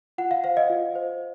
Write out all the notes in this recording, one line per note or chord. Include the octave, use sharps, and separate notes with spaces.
F4 F#5
F5
C5 F5
D#5
F4
C5